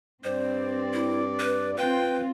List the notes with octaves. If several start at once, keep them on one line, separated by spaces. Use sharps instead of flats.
G2 C4 C5 D5
E4
B4
C4 F4 B4 G5